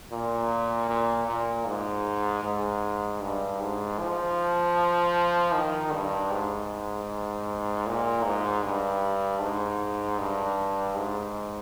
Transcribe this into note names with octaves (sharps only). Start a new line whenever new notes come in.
A#2
A#2
A#2
G#2
G#2
G2
G#2
F3
D#3
G2
G#2
A#2
G#2
G2
G#2
G2
G#2